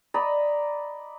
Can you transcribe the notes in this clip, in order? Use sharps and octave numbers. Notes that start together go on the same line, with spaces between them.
D5 D#5 A#5 B5